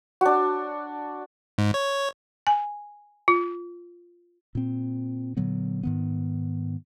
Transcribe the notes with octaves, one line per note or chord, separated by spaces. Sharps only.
D4 F#4
G#2
C#5
G#5
F4
A#2 C4
A#2 D3 F#3 B3
G#2 D#3 B3